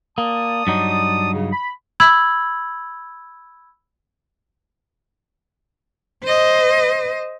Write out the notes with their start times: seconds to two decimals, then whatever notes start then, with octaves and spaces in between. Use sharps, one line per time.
0.18 A#3 D5 A5 D#6
0.67 G2 F#3 D#4
1.33 C#3
1.52 B5
2.00 B5 E6 G#6 F#7
6.24 C5 D#5